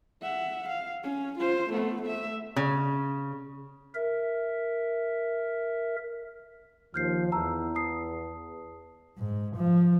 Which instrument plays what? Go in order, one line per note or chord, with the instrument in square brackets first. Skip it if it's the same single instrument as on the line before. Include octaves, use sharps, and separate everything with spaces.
[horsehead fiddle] E5 F#5
F5
C#4
F4 C5
A3 B3
A3 E5
[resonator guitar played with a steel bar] C#3
[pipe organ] A#4 E5
[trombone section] D#2 F3 [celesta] F6 G6 C7
[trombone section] E2 [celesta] A5 A#5 E6
[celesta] A5 D#6 C7
[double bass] G#2
F3